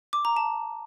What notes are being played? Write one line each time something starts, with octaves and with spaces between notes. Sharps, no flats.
D6
A#5
A5